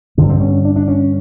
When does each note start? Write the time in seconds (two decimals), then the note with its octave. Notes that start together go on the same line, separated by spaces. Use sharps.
0.18 G2 D3 C4
0.29 C4
0.40 C#4
0.65 D4
0.76 D4
0.88 C#4